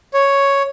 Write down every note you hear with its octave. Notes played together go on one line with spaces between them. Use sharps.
C#5